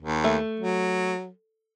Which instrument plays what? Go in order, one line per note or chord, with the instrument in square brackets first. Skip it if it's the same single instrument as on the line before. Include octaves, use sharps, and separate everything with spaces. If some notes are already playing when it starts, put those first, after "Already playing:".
[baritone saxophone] D#2
[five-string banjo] A3
[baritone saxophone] F#3